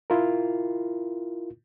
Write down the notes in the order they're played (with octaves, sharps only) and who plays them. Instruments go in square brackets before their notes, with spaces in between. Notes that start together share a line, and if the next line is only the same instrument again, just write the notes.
[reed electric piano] E4 F4 A#4